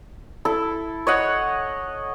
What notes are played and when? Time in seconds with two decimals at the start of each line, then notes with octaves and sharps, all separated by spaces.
0.45 E4 A4
1.07 C#5 D#5 F#5